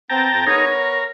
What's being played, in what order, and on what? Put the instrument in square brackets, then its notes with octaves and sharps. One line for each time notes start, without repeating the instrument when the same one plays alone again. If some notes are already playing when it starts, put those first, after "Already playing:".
[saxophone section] B3 C4 [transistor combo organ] G5 A5 A#5
[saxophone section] F2 C4
[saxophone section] B3 C#5 [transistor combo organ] D#4 G#4 A#4
[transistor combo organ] A#4